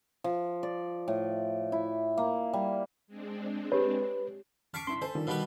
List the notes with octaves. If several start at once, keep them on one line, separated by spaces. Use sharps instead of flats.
F3
D5
A2
E4
A#3
G3
G#3 C4 D4
G4 B4 C#5
A5 C#6 D6 F6 B6 C7
G2 E4 C6 B6
A4 C5 G#5
D3 D#3 F3 G3
B2 G3 A4 B4 F5 B5